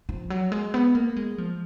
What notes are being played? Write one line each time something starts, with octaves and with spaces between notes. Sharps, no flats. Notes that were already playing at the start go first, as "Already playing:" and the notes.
F3
F#3
G#3
B3
A#3
G#3
F3